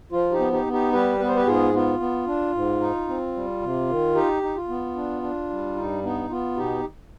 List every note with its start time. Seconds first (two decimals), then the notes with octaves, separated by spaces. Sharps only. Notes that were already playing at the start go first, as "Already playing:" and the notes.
0.12 F3 F4
0.32 D#4 G4
0.39 B3
0.52 D#4 G4
0.66 B3
0.73 D#4 G4
0.93 G3 G4 B4
1.20 B3 B4
1.28 C5
1.36 G4 B4
1.46 G#2 F4 G#4
1.74 B3 F4
2.00 B3
2.27 D4
2.55 G#2
2.81 D#4
3.08 C4
3.35 G3
3.61 C3
3.89 D#3
4.15 D#4 G4
4.43 D#4
4.56 F4
4.68 B3
4.95 D4
5.22 D4
5.50 G3
5.76 G2 D#4
6.03 B3 D#4
6.30 B3 F4
6.57 B2 D#4 G4